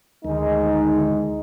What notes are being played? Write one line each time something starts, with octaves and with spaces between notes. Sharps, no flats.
D2 D#3 G#3 D#4